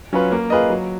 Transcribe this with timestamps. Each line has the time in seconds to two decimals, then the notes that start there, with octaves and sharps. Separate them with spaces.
0.13 F#3 C#4 F4 B4
0.32 A#3
0.50 F4 G#4 B4 D#5
0.70 F#3